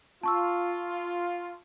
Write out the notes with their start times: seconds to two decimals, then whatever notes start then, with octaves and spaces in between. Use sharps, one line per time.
0.23 F4 A5 C#6 E6